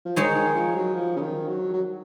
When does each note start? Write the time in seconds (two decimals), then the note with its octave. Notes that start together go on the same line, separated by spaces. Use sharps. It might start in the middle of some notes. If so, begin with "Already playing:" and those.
0.05 F3
0.16 D#3 G#3 D#4 G#4 C#5
0.36 D#3
0.56 F3
0.76 F#3
0.95 F3
1.16 C#3
1.21 D#3
1.48 F#3
1.73 F#3